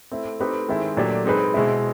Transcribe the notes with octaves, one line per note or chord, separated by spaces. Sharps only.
A3 C4 E4
A3 C4 D#4 G4 B4
D#3 G#3 C4 E4
A#2 F#3 A3 D4 G4
G#3 C4 D#4 G#4 B4
B2 G#3 C4 E4